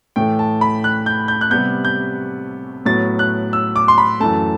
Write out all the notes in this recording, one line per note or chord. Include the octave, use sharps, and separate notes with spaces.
A2 E3 A3 G5
A5
B5
F#6
G6
G6
F#6
C3 G3 B3 G6
G6
A2 F#3 B3 A6
F#6
E6
D6
C6
B5
F#2 E3 A3 A5